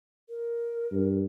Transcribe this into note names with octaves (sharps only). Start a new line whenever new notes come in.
A#4
G2